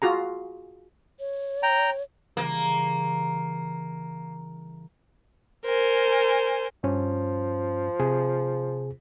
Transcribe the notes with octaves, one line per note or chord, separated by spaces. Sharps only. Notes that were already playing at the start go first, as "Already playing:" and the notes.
F4 F#4 G#4 A#5
C#5
G5 A#5
C#3 E3 G3 A#3
A#4 C5 G#5
G2 F3 C#4
C3 G#4